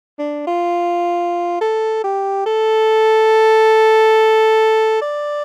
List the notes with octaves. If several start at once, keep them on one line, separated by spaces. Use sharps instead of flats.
D4
F4
A4
G4
A4
D5